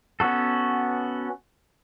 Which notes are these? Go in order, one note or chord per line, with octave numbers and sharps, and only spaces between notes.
B3 C#4 F#4 A4